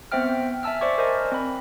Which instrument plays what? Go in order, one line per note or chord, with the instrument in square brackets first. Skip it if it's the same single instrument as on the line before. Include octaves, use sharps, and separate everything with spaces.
[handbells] B3 C4 C5 E5 G5 F6
E5 G#5 A5 E6 F6
C5 D5 E5 C#6 D6 G#6
A#4 C5 D#5 G#5
C4 B5